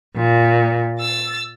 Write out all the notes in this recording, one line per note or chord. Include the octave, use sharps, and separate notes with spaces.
A#2
E6 A6